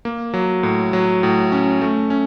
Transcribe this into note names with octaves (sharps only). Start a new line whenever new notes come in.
A#3
F#3
A2
F#3
A2
C#4
A3
C#4